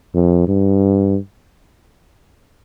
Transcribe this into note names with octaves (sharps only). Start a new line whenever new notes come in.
F2
G2